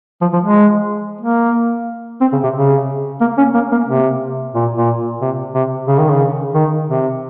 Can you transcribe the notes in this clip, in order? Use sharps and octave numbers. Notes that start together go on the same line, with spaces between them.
F3
F3
G#3
A#3
C4
C#3
C3
C#3
A#3
C#4
A#3
A#3
C3
A#2
A#2
C3
C3
C#3
D#3
C#3
D#3
C3